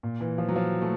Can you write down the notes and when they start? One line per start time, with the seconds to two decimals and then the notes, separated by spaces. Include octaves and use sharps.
0.03 A#2
0.21 E3
0.38 F3
0.49 F#3
0.56 F3
0.82 A3